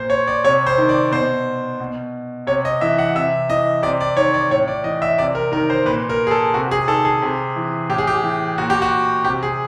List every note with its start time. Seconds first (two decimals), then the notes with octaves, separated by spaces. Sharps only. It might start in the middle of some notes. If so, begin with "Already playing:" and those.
Already playing: A#2 C5
0.10 C#5
0.27 D5
0.44 C3 C#5
0.66 C5
0.78 D#3
0.89 D5
1.11 B2 C5
1.80 B2
2.47 C3 C#5
2.65 D#5
2.81 E3 E5
2.99 F#5
3.15 C3 E5
3.50 E3 D#5
3.83 C3 D5
4.01 D5
4.17 D#3 C#5
4.34 D5
4.50 A2 C#5
4.68 D5
4.84 E3 D#5
5.02 E5
5.18 C3 D5
5.35 A#4
5.52 D#3 A#4
5.70 C5
5.86 A#2 B4
6.09 A#4
6.27 G#4
6.31 A4
6.54 C3 F#4
6.71 G#4
6.88 D#3 A4
7.05 G#4
7.22 C3
7.56 E3
7.89 A2 G4
7.98 G#4
8.07 G4
8.24 E3
8.58 A#2 F#4
8.70 G4
8.82 F#4
9.25 C3 G4
9.43 G#4